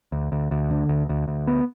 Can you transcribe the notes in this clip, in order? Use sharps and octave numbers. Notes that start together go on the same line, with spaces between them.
D2
D2
D2
D3
D2
D2
D2
B3